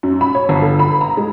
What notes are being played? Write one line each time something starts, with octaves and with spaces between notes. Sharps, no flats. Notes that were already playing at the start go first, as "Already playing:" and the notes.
F#2
B5
C#5
G1
A4
B5
A#5
G#3